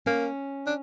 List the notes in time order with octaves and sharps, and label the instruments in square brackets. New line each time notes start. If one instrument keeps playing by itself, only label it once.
[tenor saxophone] A#3 [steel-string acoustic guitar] C#4
[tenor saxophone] D4